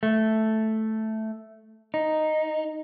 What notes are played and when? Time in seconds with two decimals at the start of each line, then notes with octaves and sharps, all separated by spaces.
0.03 A3
1.94 D#4